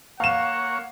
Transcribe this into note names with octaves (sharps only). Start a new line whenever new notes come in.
A#3 C#5 F5 F#5 E7